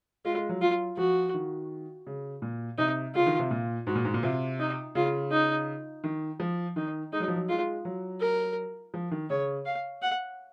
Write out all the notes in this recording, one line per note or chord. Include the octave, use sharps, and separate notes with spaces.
G#3 F4
G#3
F#3
F#3 F4
F3 F#4
D#3
C#3
A#2
C3 D#4
C#3 F4
D#3
C3
A#2
G#2 F#4
A#2
G#2
A#2
C3 F4
D#4
C#3 F4
D#4
D#3
F3
D#3 D#4
G#3 D#4
F#3
F3
F#3
G#3 F4
F#3
A#4
F3
D#3
C#3 C#5
F5
F#5